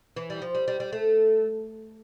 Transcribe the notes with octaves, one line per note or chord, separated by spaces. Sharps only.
E3
G3
F3
G3
G3
G3
A3